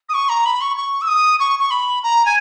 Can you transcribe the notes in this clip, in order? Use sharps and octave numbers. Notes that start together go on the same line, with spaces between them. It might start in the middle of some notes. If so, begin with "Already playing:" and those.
D#6
C#6
A#5
B5
C#6
C#6
E6
D#6
C#6
C#6
B5
A#5
G#5